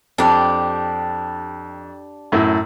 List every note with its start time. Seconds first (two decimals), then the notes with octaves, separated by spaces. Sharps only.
0.18 F2 D4 G4
2.32 F#2 A2